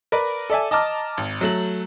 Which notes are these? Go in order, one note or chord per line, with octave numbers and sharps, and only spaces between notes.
A#4 B4 D5
A4 D5 E5 G#5
D#5 A5 A#5 D6 F6
G#1
F#3 A3 F#7